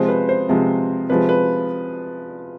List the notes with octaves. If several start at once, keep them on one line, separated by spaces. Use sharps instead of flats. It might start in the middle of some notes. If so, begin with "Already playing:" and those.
Already playing: C3 F3 G#3 C5
B4
C5
C3 F3 G#3
C3 F3 G#3 B4
B4